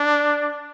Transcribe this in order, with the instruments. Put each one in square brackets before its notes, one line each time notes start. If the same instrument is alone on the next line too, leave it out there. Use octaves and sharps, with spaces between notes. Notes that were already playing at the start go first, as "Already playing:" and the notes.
Already playing: [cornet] D4